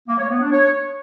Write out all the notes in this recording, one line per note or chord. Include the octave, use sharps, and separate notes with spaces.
A#3
C#5
B3
D4
C#5